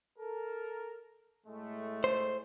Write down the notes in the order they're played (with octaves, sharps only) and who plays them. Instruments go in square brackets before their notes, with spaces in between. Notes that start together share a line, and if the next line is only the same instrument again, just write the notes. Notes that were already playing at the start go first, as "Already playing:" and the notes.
[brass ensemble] A4 A#4
A2 G#3 A3
[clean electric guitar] C5